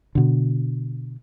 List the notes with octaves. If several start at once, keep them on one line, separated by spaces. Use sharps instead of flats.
B2 D3